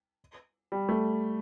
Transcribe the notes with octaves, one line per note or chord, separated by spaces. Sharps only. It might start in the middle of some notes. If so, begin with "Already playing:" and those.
G3
A3